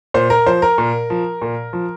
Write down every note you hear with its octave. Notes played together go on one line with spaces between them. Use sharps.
A#2 C5
A#4
F3 C5
A#4
A#2
F3
A#2
F3